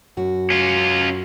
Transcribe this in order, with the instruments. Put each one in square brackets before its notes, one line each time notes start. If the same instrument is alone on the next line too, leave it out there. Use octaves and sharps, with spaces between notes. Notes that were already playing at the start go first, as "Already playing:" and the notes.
[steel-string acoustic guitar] F#2 F#4
[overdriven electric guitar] C#4 F4